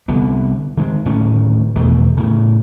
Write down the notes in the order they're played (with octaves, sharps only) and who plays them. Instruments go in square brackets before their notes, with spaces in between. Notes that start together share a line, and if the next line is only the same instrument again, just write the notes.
[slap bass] C2 D3 B3
D#3 G#3
D1 A2 D#3 C#4
E2 B2 D#3 A3
A2 C#3